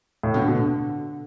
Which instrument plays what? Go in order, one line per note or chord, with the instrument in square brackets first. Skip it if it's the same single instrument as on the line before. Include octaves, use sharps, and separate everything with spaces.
[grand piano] A2
[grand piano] B2 [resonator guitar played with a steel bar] D3
[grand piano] B2